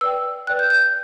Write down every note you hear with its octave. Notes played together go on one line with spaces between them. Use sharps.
B4 D5 G5 E6
B4 D5 G5 F#6
G6
G6